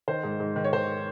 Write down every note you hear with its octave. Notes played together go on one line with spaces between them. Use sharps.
D#3 C5
G#2
G#2
D#3
C#5
D#3 C5